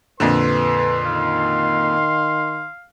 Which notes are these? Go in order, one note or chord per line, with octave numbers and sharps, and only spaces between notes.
F2 A#2 D3 B4 C6
D#3 F5